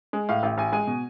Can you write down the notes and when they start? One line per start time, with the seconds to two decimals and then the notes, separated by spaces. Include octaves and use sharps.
0.13 G#3
0.29 A2 F5
0.43 A1
0.58 A1 G#5
0.72 G#3 G#5
0.87 B2